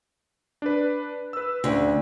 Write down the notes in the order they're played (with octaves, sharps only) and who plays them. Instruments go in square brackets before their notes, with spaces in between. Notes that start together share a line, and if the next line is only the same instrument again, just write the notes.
[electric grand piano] D4 B4
B4 E6
[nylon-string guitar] D2 [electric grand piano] C#3